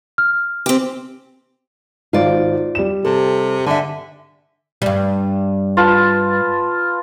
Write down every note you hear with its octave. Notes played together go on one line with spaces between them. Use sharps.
F6
C4 G4
G#1 F4 D5
G3 E7
C3 A4
D3 E5 G#5
G2 G3
F4 B4 A5